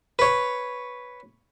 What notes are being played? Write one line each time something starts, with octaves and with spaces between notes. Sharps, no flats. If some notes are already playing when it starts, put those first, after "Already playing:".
B4 C#5